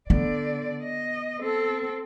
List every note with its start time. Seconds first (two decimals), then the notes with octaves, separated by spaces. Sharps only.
0.10 D3 B3 D5
0.83 D#5
1.40 C4 A4